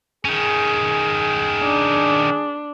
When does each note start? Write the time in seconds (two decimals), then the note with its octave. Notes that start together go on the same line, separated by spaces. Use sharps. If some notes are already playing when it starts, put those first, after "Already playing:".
0.25 D#3 C#4 G#4
1.63 D4